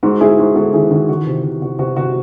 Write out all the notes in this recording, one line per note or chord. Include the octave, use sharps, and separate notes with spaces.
G#2 F#4
G#2 E4 G#4
G#2 F#4
G#2 F#4 A4
D#3 E4 G#4
D#3 F#4
E3 F#4
C3
C3
C3 F#4
C3 F#4
C3 F#4